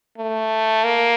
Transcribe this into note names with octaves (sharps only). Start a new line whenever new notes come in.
A3
A#3